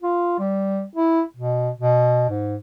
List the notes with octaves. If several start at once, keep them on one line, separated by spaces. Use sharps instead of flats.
F4
G3
E4
B2
B2
G#2